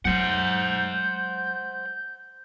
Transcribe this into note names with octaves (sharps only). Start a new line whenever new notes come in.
F#3 G#3 C5 F#5 G6